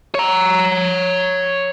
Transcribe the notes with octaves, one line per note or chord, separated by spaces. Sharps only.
C#5 A#5